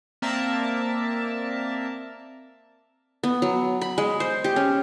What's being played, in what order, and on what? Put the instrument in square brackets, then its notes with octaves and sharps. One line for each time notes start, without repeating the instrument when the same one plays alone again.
[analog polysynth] A#3 C4 A#4 D5 E5 A5
[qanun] B3
F#3
B5
G#3
C5
G4
C#4